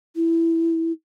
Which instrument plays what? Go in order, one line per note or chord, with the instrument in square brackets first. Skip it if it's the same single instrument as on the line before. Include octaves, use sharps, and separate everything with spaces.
[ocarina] E4